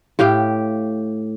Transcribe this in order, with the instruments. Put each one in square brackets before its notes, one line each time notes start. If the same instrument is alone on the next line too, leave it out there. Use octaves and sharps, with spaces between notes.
[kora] A2 G4 F5 G5